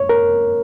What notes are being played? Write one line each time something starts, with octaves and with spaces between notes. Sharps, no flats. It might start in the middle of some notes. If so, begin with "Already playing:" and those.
Already playing: C#5
A#4